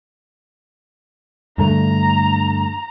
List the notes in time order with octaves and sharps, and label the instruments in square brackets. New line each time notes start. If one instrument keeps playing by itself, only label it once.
[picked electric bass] G2 D3 A3 [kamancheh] A#5